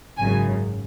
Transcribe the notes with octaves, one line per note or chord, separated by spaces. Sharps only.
G#1 F#2 C#3 G#5